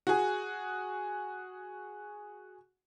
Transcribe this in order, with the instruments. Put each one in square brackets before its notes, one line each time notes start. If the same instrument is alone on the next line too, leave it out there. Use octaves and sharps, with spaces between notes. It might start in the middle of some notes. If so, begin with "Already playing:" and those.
[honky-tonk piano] F#4 G#4